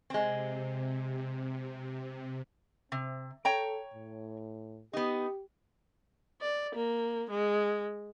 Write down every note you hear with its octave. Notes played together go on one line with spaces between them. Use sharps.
C3 G#3 C4
C3 C4
A4 C#5 G5 A#5
A2
B3 D#4 G4
D5
A#3
G#3